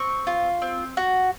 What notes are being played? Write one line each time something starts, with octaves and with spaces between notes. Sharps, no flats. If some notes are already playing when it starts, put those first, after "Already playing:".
Already playing: C4 C#6
F4
C4
F#4